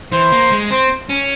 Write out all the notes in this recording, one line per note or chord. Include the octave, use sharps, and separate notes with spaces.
E3 C5
A#3
G#3
C4 C5
C#4